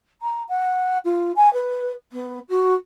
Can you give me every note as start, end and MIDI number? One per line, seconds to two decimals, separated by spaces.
0.21 0.43 82
0.48 0.97 78
1.04 1.32 65
1.36 1.52 80
1.53 1.92 71
2.12 2.39 59
2.49 2.73 66